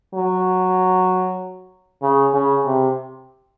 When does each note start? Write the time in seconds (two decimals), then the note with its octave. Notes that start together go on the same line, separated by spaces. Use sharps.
0.14 F#3
2.02 C#3
2.33 C#3
2.65 C3